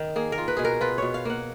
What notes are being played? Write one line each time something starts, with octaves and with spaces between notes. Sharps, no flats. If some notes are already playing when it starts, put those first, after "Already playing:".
Already playing: D#3
A#3 G#4
A#4
F4
B4
B2 G#4
A#4
F4 B4
B2 C#5
F5
A#3 F#5